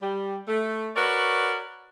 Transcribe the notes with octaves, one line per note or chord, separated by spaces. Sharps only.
G3
A3
F#4 A#4 B4 C#5 D5